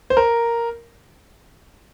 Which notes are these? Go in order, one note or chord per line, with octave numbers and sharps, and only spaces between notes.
C5
A#4